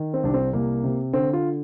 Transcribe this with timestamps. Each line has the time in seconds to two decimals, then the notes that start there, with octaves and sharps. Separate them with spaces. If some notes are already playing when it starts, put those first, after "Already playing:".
Already playing: D#3
0.14 C4
0.23 C2 D4
0.34 C4
0.53 C2 A#3
0.84 C3
1.13 D3 C4
1.33 F4